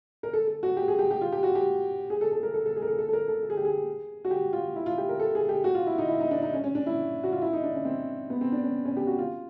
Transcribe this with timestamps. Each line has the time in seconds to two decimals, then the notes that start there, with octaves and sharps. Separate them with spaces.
0.23 A#4
0.33 A4
0.47 A4
0.63 F#4
0.77 G4
0.88 G#4
0.99 G4
1.11 G4
1.21 F4
1.32 G4
1.43 F#4
1.55 G4
2.10 G#4
2.21 A4
2.32 A4
2.43 A#4
2.54 A4
2.66 A4
2.76 G#4
2.82 A#4
2.88 A4
2.99 A4
3.09 A4
3.13 A#4
3.28 A4
3.43 A4
3.50 G#4
3.57 G4
3.65 G#4
4.25 F#4
4.31 G4
4.53 F4
4.76 E4
4.86 F4
4.98 G4
5.09 A#4
5.20 A4
5.35 G#4
5.49 G4
5.64 F#4
5.75 F4
5.87 E4
5.98 D#4
6.08 E4
6.20 D#4
6.31 D4
6.42 D#4
6.53 C#4
6.64 C#4
6.75 D4
6.86 E4
7.23 F#4
7.32 F4
7.42 E4
7.53 D#4
7.63 D4
7.74 C#4
7.85 C4
8.30 B3
8.41 C4
8.52 D4
8.63 C#4
8.85 C#4
8.97 G4
9.07 F#4
9.18 F4